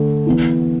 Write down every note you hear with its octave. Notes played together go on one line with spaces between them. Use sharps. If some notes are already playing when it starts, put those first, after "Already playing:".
Already playing: D3 A3
E3 B3 E4